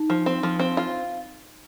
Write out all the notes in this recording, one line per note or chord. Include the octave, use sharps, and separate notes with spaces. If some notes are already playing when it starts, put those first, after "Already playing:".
Already playing: D#4
F3
C4
F3
C4
F4